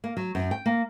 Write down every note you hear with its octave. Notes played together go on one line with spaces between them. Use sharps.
A#3
F#3
F#2
G5
A#3